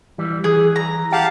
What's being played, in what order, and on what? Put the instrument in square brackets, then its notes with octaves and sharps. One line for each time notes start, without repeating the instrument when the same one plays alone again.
[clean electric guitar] E3 G3
[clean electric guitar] E3 [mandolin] G#4
[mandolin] A#5
[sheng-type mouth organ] G4 F5 A5 [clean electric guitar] F#5